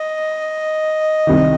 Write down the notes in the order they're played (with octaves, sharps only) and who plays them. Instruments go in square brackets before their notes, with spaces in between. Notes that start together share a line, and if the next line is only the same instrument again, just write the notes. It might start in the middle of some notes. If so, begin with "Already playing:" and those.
Already playing: [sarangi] D#5
[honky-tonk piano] C2 C3 D#3